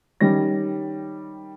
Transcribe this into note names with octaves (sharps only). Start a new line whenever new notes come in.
D#3 G3 C#4 A#6